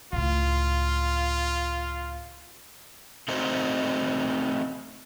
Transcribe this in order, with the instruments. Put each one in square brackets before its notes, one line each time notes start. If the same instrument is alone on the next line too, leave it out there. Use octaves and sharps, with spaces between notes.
[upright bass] C#2 A2 [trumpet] F4
[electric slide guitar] A3 C4 D#4 F#4 C5